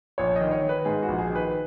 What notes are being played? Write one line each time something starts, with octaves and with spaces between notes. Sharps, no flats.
A#1 C#5
D#3 D#5
C#5
D#3
B4
G#2 G#4
F#4
A#1
G#4
D#3
B4